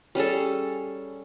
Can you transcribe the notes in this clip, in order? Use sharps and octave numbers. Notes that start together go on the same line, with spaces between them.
G3 C#4 G#4 A4